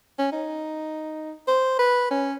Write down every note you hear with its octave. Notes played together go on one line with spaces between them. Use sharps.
C#4
D#4
C5
B4
C#4